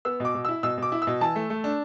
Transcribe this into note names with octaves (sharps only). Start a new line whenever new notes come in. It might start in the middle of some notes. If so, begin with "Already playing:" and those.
B3 E6
B2 D6
B2
E4 E6
B2 E6
B2 D6
E4
E6
B2
E3 A5
A3
A3
D4